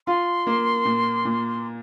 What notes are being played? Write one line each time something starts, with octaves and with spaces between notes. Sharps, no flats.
F4 C6
A#3
A#2
A#2